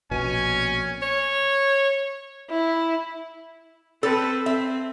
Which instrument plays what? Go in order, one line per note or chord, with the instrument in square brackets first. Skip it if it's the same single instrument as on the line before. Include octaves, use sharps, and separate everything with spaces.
[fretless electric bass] A#1 B2 [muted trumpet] C#4 [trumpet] G#5
[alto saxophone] C#5
[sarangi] E4
[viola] C4 B4 [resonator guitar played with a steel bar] A4
[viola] C4 [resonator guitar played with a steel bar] E5